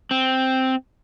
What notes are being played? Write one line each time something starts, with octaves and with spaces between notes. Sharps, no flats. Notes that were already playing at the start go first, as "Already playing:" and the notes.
C4